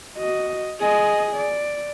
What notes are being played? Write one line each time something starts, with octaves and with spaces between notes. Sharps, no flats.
F#4 D#5
G#4 D#5
D5